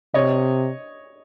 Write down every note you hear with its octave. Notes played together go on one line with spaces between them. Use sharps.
C3 C#5 D#5